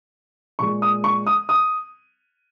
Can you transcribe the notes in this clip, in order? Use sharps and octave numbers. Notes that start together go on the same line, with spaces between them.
A#2 G#3 C#6
D#6
C#6
D#6
D#6